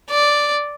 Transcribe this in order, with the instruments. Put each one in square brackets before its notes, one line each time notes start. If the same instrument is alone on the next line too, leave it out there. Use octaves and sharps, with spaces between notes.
[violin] D5